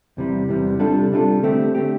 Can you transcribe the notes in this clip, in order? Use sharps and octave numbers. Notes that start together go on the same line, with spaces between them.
E2 C3 E3 G3
E2 C3 E3 G3
C3 G3 D4 F4 A4
C3 G3 D4 F4 A4
D3 A3 C4 G4
D3 A3 C4 G4